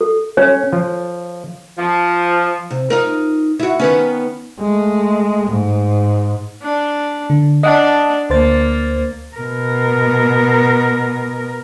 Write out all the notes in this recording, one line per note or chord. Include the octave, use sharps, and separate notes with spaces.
A4
C#4 C#5
F3
F3
C3
D#4 F4 A#4
E4 F#4
D#3 B3 C#4
G#3 A3
G#2
D4
D3
D4 D#5 F#5 A5
D2 A#3 C5 A6
B2 A#4